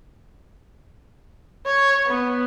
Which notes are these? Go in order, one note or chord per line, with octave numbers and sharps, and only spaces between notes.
C#5
B3